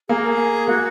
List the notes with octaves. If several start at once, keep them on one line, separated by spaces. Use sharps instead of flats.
A#3 G#4
A#4
G#4
A#3 F#4